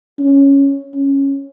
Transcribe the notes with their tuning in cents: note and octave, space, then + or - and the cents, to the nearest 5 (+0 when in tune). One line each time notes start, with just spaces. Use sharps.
C#4 +0
C#4 -10